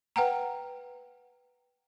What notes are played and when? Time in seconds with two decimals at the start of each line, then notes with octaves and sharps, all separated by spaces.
0.16 B4 F#5 G5 A#5